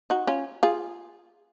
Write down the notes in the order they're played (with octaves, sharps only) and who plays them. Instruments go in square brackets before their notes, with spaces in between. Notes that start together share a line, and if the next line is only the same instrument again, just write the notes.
[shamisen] D#4 F#4
C#4 F4
F4 G#4